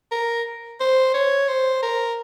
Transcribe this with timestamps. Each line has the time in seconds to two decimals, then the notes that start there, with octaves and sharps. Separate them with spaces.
0.12 A#4
0.80 C5
1.14 C#5
1.48 C5
1.82 A#4